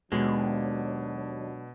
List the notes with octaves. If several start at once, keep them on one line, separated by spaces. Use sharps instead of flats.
D#2 B2 F#3 G#3 D4